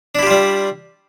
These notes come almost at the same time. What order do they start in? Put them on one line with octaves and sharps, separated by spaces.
D4 E4 G4 F4 G3